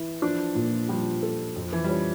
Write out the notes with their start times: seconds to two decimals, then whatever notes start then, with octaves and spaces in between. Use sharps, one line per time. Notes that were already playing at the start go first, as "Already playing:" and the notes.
Already playing: E3
0.22 F3 D4
0.55 A#2
0.89 F3 G3
1.23 A4
1.56 F2 F3
1.73 E3
1.84 G3
1.89 F3 C#4